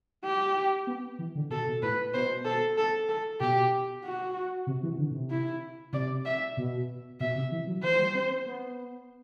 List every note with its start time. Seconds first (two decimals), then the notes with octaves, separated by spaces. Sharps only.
0.25 G4
0.87 B3
1.19 E3
1.35 D3
1.50 B2 A4
1.67 B2
1.82 A2 B4
2.14 B2 C5
2.45 A4
2.78 A4
3.09 A4
3.40 B2 G4
4.04 F#4
4.67 C3
4.83 E3
4.98 D3
5.11 B2
5.14 C3
5.31 E4
5.93 C3 D5
6.25 E5
6.57 B2
7.20 B2 E5
7.35 C3
7.51 E3
7.67 F#3
7.83 E3 C5
7.99 G3
8.14 C4
8.31 C4
8.46 B3